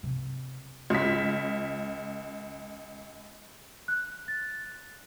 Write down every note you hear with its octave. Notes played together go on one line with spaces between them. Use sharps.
C3
C#2 B6
F#6
A6